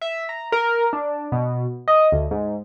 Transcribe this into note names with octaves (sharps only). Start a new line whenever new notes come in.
E5
A#5
A#4
D4
B2
D#5
D2
G#2